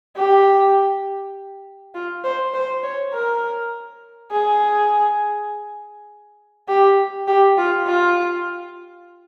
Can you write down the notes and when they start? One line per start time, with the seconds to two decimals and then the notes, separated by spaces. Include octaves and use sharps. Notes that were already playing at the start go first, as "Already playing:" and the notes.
0.16 G4
1.94 F4
2.24 C5
2.54 C5
2.83 C#5
3.13 A#4
4.32 G#4
6.68 G4
7.27 G4
7.58 F4
7.87 F4